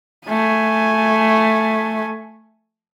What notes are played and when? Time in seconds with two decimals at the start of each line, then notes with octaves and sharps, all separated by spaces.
0.27 A3 G#5